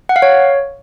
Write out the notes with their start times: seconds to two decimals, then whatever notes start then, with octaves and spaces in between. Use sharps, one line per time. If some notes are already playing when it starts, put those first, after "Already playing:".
0.09 F#5
0.16 F5
0.22 C#5